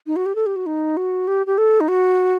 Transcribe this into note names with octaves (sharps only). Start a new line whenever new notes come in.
D#4
F#4
G4
A4
G4
F#4
D#4
F#4
G4
G4
A4
D#4
F#4